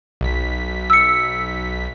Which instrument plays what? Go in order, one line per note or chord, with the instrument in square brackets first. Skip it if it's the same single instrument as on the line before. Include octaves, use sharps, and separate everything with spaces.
[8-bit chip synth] B1 B6
[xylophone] E6 C#7